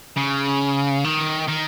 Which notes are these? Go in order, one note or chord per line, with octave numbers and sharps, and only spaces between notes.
C#3
D#3
D#3